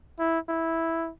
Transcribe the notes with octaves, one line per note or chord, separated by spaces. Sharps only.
E4
E4